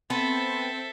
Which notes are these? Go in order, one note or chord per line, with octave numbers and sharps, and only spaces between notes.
B3 C4 A4 E5